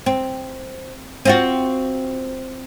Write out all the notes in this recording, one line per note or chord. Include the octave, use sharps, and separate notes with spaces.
C4
C4 F4 F#4